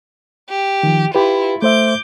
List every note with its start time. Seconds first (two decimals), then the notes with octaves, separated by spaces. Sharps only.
0.49 G4
0.83 D#3 F3
1.15 E4 F4 G4 B4
1.62 A3 C5 E5 D6 G6